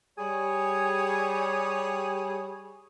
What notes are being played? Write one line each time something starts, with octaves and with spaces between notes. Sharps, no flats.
G3 G#4 C#5